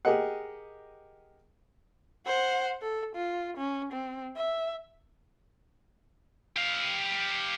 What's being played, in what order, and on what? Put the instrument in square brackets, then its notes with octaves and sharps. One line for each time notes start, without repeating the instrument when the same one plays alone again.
[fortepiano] G4 G#4 A#4 D#5 F#5
[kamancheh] C5 F#5
A4
F4
C#4
C4
E5
[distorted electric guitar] G4 F5